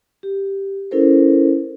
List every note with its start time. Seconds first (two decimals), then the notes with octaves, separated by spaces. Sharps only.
0.23 G4
0.91 C#4 E4 A4 A#4 C5